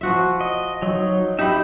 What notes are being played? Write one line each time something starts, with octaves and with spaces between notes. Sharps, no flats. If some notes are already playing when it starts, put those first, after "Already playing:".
F3 F#4 E5
D#5
F#3 D#4
D#4 G4 E5 B5